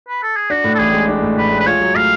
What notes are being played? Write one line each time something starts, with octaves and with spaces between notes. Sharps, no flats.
B4
A4
G#4
D4 F#4
A2
A4
A1 G#4
G#3
D4
A2
A1 B4
G#3
B4
F4 C#5
F#3
A2 F5